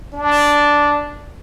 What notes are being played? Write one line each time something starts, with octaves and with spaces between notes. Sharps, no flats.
D4